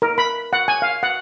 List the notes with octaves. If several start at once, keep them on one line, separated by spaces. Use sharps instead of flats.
A#4
B5
F#5
G#5
F5
F#5